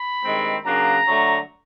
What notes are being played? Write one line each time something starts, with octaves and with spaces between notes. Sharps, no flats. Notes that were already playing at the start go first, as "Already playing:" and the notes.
Already playing: B5
G2 D#3 G#3 C4
C#3 F#3 A#3 D4 A#5
D3 F#3 A3